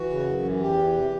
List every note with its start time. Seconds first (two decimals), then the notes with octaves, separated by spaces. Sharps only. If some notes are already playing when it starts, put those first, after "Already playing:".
Already playing: E3 F#4
0.10 C#3
0.26 F#2
0.43 E3
0.60 E2 G4
0.78 E3
0.95 C3